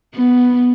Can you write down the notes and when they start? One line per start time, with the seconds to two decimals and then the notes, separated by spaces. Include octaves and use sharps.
0.15 B3